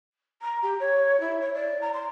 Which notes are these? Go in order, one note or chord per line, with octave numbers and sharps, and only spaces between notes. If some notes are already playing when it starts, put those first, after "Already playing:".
A#5
G4
C#5
E4
C#5
D5
A#5
C6